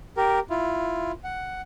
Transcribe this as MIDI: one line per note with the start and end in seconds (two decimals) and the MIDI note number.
0.17 0.39 67
0.17 0.39 70
0.50 1.12 64
0.50 1.12 65
1.24 1.61 78